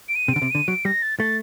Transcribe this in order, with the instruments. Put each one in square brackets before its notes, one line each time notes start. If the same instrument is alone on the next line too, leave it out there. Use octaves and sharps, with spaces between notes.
[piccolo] D7
D#7
[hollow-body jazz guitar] C3
[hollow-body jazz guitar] D3 [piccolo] D7
[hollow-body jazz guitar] C3
[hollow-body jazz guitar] D3 [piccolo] D#7
[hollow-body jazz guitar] F#3 [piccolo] D7
[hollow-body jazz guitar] G3 [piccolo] A#6
[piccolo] A6
[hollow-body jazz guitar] A3 [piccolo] A6